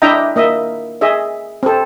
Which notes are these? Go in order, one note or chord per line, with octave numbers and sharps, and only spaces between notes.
D4 E4 D#5 E5 G5 A#5
A#3 D#5 E5
G#4 D#5 E5
C4 A4